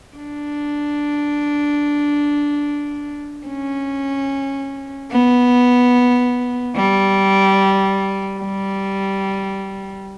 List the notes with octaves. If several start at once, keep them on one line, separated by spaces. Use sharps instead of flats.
D4
C#4
B3
G3
G3